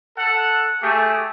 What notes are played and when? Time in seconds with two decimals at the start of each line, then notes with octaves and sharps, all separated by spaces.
0.18 A4 F#5
0.83 A3 G4 G#4